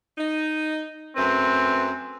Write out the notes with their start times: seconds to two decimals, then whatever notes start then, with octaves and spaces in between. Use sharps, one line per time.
0.18 D#4
1.17 F#2 A3 C4 B4